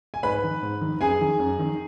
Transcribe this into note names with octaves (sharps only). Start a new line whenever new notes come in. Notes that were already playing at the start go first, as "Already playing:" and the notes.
G#5
G#2 B4 B5
D#3
G#2
D#3
F#2 G#4 G#5
D#3
F#2
D#3